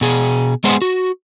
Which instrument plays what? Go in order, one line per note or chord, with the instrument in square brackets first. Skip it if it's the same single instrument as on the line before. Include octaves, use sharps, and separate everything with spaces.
[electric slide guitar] B2 G#4
G#3 B3 G#4 C5 F#5
F#4